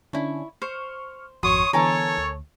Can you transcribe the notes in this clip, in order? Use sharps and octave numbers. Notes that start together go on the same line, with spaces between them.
D3 C#4 D4 E4 C#6
C5 C#6 F6
G#1 F2 F#4 C#5 C6 C#6 D#6
D3 E3 B3 A4 A#4 C#5 G#5 A5
D2